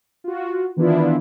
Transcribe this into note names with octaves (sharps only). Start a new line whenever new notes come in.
F4 F#4
D#3 E3 B3 D4 E4 F4